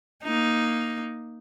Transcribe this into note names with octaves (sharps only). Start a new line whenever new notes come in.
A#3 D#4